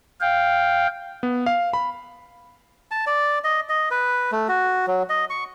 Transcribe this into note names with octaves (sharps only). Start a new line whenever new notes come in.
F5 G5
B3
F5
B5
A5
D5
D#5
D#5
B4
A3
F#4
F#3
D#5
C#6